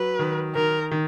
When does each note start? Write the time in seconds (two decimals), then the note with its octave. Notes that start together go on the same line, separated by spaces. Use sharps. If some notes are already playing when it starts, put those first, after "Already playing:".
Already playing: F#3 B4
0.19 D#3
0.55 D#3 A#4
0.91 D#3